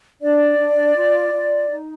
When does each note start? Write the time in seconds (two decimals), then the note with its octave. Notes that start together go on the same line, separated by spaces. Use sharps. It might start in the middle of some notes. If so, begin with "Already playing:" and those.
0.22 D4 D5
0.59 D4
0.95 F4
1.32 F4
1.69 D#4